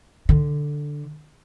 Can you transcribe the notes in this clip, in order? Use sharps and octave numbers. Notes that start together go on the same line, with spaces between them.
D3